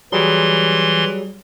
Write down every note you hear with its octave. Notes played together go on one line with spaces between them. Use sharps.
E3 F#3 G3 G#4 C6